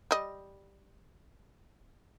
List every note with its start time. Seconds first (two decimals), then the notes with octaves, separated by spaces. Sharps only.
0.11 G3 D#5